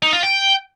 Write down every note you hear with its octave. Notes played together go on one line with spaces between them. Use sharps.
D#4
F4
G5